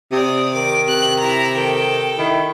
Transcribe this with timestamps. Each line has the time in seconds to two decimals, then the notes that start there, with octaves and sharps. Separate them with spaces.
0.12 C3 D5 D#6
0.53 D#3 D6
0.88 C3 F#6
1.19 E4 A#5
1.55 D#3 A4 G5
2.18 D#3 E4